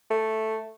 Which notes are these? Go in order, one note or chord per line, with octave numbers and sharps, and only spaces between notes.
A3